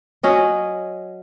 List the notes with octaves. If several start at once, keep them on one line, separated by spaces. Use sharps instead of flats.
F#3 C#4 D#5